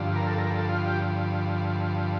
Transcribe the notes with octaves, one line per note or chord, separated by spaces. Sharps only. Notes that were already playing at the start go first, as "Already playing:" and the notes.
Already playing: G2 D3 F3
A#4
A4
A#4
A4
F4
G4